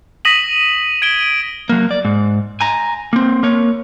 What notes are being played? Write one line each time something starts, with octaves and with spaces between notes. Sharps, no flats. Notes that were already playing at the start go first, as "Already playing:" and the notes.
D#6 A#6 B6 D#7 E7 F#7
G#6 D7 G7
F#3 A#3
D5
G#2
G#5 A#5
A#3 C4
A#3 C#5